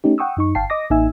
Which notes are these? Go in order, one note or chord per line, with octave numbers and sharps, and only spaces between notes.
A3 C#4 D#4 G4
F#5 G5 C#6 D#6 E6
F#2 D#4 C#6
G1 F5 G5 A5 C7
D#5 D6 D#6 A#6
A1 A#3 D#4 E5 G#5 E6